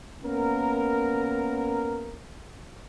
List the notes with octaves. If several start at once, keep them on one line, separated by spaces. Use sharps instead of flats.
A#3 B3 C#4 A#4